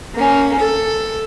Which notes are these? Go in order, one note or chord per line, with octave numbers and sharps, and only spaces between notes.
A#3 C#4
A4